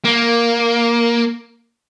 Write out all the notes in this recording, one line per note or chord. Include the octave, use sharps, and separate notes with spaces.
A#3